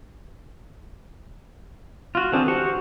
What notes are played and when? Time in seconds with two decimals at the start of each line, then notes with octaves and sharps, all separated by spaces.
2.15 F4 F#4
2.32 D3 E3 C4 D4 G#4
2.48 F#4 G4 C5 F#5 C#6